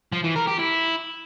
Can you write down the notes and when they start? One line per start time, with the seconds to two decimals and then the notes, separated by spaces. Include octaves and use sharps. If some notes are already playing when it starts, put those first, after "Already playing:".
0.12 F3
0.24 E3
0.36 A#4
0.47 G4
0.59 E4